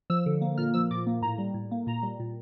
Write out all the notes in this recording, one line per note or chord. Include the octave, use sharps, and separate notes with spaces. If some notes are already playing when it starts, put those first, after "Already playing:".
F3 E6
D3
A#3
A#2 F6
F3 E6
A#2 D6
A#3
A2 A#5
G3
A2
A#3
A#2 A#5
G3
A#2